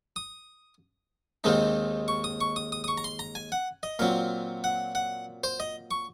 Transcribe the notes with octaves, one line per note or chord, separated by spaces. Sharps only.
D#6
D#2 D#3 G#3 C4 D#4
C#6
D#6
C#6
D#6
D#6
D#6
C#6
A#5
C6
A#5
G#5
F#5
D#5
A#2 F#3 C4 F5
F#5
F#5
C5
D#5
C#6